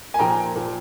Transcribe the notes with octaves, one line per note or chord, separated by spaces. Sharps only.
G#5
A#2 F3 G5 A#5
A#2 F3